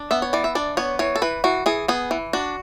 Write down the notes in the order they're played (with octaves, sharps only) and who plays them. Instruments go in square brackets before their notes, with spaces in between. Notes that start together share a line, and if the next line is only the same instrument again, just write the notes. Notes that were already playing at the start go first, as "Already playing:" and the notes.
Already playing: [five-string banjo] D4
B3 E5
C#5
E3 D5
E5
D4 D5
B3 C#5
E3 C#5
A4
E3 B4
E3 F#4
E3 G#4
B3 G#4
E3
D4 F#4